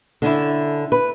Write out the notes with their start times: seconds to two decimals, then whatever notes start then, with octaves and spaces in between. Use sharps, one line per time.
0.22 D3 C#4 D4 E4
0.92 B4